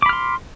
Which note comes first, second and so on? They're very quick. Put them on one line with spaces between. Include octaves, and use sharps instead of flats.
D6 B5 F6 C6